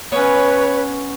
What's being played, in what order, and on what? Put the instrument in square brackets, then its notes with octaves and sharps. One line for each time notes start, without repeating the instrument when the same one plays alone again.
[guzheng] B3 C#4 [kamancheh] B4 [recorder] C#5